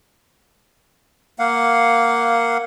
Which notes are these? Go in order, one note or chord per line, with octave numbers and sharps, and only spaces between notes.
A#3 F5 F#5